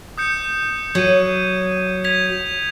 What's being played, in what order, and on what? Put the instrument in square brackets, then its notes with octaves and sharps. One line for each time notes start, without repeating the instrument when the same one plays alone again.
[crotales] D#6 G6 C#7
[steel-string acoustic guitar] F#3 [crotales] G#6 D#7
[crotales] G#6 B6 F7